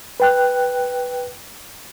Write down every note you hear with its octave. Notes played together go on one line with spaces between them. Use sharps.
B4 G5 F#6